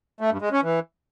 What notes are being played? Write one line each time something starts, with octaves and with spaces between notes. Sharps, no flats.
A3
G2
G#3
C#4
E3